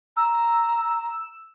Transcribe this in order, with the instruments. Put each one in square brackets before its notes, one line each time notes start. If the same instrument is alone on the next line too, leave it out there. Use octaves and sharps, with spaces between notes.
[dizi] A#5 [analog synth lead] E6